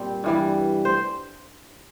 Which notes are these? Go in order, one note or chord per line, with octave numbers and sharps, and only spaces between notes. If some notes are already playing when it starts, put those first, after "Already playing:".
Already playing: A#2 G3 C4
G2 E3 G3
C5